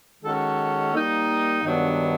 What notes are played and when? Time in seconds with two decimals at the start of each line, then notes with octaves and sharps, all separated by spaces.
0.23 D#3 G#3 C#4 F#4 A4
0.94 G3 A#3 D#4
1.63 G2 D#3 F#3 B3 D4